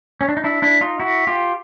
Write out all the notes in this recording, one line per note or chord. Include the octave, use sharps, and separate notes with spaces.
C#4
D4
D#4
D4 E4
D4 E4
D#4 F4
E4 F#4
F4 G4